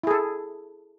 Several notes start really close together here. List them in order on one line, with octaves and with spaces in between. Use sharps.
E4 G#4 A4